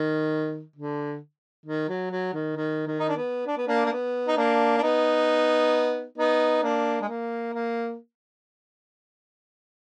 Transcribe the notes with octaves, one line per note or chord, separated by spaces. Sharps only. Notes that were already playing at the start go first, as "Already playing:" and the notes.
Already playing: D#3
D3
D#3
F#3
F#3
D#3
D#3
D#3
D#4
D4
B3
D4
B3
A#3 D4
A#3
B3
D#4
A#3 D4
D4
B3 D#4
B3 D#4
A#3 D4
G#3
A#3
A#3